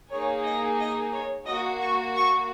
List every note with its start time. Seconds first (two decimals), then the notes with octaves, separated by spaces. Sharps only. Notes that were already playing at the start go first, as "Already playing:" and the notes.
0.11 A#3 D#4 G#4 C#5
0.45 D#5
0.79 D#5
1.14 C#5
1.46 A#3 F#4 D#5
1.81 C#6
2.15 C#6